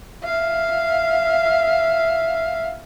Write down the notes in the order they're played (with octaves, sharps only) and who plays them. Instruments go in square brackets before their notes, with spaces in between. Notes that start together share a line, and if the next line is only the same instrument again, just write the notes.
[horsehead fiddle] E5 F5